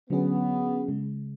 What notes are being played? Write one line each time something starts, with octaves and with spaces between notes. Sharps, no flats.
D3 F#3 B3 C#4 G#4
C#3 G#3